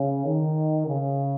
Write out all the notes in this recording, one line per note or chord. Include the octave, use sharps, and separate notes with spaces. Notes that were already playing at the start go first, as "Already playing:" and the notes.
Already playing: C#3
D#3
C#3